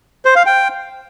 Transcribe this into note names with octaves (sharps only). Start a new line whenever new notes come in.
C5
F5
G5